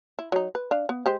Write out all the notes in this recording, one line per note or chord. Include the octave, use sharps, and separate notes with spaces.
E4
F#3 D#4
B4
D4 F5
B3
G#3 G4 C5